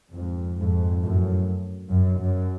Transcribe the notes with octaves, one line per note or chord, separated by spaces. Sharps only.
F2 G#2
F2 G#2
F#2 A2
F#2
F#2